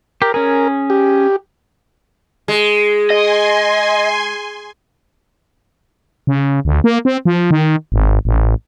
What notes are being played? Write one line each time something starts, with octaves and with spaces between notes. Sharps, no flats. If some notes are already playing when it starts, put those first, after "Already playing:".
G4 A#4
C#4 G#4 A#4
G4
G#3
D#5 G#5 C6
C#3
D2
A#3
C4
F3
D#3
G#1
A1